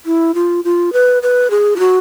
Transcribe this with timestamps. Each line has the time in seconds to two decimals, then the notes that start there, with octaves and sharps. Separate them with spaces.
0.06 E4
0.35 F4
0.65 F4
0.93 B4
1.23 B4
1.50 G#4
1.76 F4
1.79 F#4